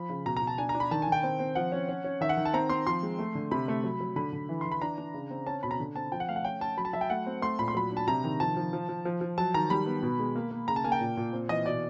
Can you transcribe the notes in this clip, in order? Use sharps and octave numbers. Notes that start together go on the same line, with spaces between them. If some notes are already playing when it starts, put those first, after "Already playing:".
Already playing: F3 B5
C#3
B2 A#5
A#5
B2
A5
D4 G#5
A#5
D4
B5
D#3 A5
G#5
D#3 G5
C4
C4
F3 F#5
C#4
C#4
C#4
D#3 E5
F#5
D#3
A5
C4 A#5
C4 C6
F3 C6
G#3
A3
D3
C3 B5
A3
F#3
F#3
D3 B5
D3
E3
E3 C6
B5
D4 A#5
D4
C#3
C4
C#4 A5
B2 B5
A#5
D3
C4 A5
F3 G5
F#5
A3 F5
F#5
C#4 G5
C#4 A5
F#3 B5
A5
F#3 E5
G5
A3 F#5
C4
A3 C6
A#2 B5
C6
F#3 B5
D4
A5
C3 A#5
D#3
F3 A5
F3
F3
F3
F3
F3
F#3 A5
D#3 A#5
G3 B5
B3
B2
G#3
A#3
A#3
C#3 A#5
A5
A#3 G#5
G5
A#2
A#2
C4
E3 D#5
B2 D5